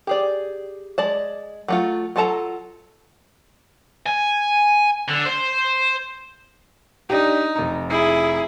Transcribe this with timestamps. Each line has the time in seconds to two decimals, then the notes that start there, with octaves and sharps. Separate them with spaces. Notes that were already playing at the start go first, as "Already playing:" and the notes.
0.07 G4 G#4 D5
0.98 G#3 D5 A5
1.68 F#3 A3 F4
2.16 F#3 F4 A4 A5 A#5
4.06 G#5
5.09 D3
5.26 C5
7.10 D4 D#4 G4
7.55 F1 A#5
7.90 E4 G#4